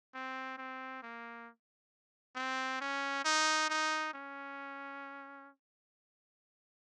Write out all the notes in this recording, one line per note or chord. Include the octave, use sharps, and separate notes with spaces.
C4
C4
A#3
C4
C#4
D#4
D#4
C#4